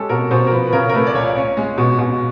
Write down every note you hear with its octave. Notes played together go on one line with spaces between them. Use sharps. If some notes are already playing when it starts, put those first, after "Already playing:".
Already playing: G#3 C#4 G4 A4
B2 A#4
B2 C5
A#4
F3 B4
B4
C#3 A#4
A#4
A3 B4
D5
C#2 C#5
C#4
G#3
B2
B2